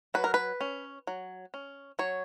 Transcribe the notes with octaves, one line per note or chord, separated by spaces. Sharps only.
F#3 B4
A#4
B4
C#4
F#3
C#4
F#3 C#5